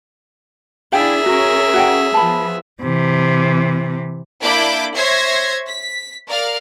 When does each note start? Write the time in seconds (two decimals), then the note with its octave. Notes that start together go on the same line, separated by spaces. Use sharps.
0.92 D4 E4 G#4 E5 F5 G5 G#5
1.26 C#4 F#4 A#4
1.74 F#4 F#5 G5
2.14 F3 B3 A5 B5
2.82 C3 E3
4.41 A#3 D4 E4 B5 D6 G6
4.95 C5 C#5 E5 G#6 A#6 C7
5.67 B6
6.28 A#4 D5 F5 F6